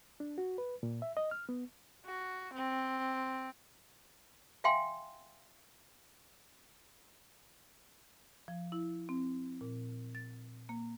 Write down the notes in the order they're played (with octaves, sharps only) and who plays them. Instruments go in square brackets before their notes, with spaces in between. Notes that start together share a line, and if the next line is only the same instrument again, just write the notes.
[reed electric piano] D4
F#4
B4
A#2
E5
D#5
F6
B3
[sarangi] F#4
C4
[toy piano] E5 F5 G5 G#5 C6
[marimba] F3
E4
C4
A#2
A6
A#3